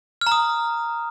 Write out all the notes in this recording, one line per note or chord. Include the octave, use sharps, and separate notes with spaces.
F6
A#5
D#6